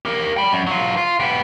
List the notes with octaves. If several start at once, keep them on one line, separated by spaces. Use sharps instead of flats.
G4 A#4
G5 B5
F#2
F#3 F4
F4
B3 G4